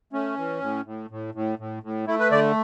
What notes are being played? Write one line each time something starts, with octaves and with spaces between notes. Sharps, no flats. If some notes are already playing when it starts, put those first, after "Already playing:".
A3 C#4
E3
A2
A2
A2
A2
A2
A2
A3 E4
B4
D3 D5